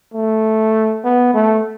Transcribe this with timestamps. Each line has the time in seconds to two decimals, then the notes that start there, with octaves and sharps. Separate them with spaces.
0.14 A3
1.04 B3
1.34 A3